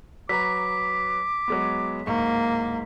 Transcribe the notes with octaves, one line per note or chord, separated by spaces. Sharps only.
F#3 B4 A#5 D6 B6
F#3 G#3 B3
D1 G#2 A#3 C#6